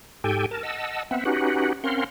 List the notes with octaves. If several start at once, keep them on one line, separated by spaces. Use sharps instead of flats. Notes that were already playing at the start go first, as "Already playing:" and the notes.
G#2 G4 A4 G5 G#5
A#4 A5
D#5 F#5 A5 E6
B3 C4 E5 F#5
C#4 D#4 F#4 G4 B4 F#5
C4 C#4 A#4 F5 F#5 C6